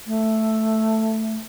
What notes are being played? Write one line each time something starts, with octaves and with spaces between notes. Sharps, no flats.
A3